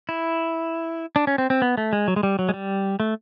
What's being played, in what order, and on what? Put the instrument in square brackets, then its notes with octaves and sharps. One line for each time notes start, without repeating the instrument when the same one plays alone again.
[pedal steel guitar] E4
D4
C#4
C4
C4
B3
A3
G#3
F#3
G#3
G3
F#3
G#3
G3
A3